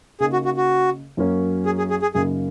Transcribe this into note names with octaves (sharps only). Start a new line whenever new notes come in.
C#3 A#3 D#4 G#4
F#4
F#4
F#4
F#2 F#3 A#3 C#4
G#4
G#4
G#4
G#4
F#2 C#3 A#3 D#4 G#4